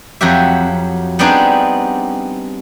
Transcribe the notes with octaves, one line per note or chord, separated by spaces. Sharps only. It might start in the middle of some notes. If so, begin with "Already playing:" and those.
F2 F#3 F#4 G4 E5
G3 B3 C4 D4 D#4 G#4